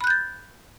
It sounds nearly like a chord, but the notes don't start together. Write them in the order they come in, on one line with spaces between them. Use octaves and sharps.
B5 F#6 G6 A6